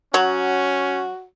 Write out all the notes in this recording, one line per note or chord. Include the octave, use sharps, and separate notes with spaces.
F#3 C#4 F#4